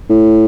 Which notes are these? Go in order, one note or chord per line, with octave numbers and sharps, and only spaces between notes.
A2